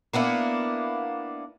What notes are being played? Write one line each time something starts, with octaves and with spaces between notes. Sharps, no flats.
A#3 B3 D4 E4